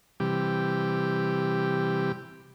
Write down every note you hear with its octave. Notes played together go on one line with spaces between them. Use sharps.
C3 E3 G3 G4